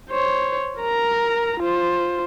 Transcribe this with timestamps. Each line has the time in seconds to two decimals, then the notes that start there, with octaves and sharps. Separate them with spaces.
0.11 C5 C#5
0.80 A#4 A#5
1.60 F4 C5